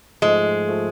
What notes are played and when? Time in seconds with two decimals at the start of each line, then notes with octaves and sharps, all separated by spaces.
0.22 G#2 F3 G#3 A3
0.69 F3 A3